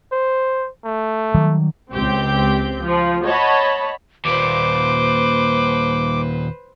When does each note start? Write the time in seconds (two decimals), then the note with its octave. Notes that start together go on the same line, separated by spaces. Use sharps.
0.12 C5
0.85 A3
1.34 D#3 F#3 G3
1.92 C#2 C4 G4 G6
2.83 F3
3.25 C#5 D#5 F#5 A5 B5
4.25 D#2 A#2 B4 C5 D6